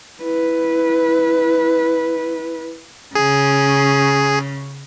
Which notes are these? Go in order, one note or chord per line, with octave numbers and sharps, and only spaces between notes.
E4 B4
C#3 C#4 G#4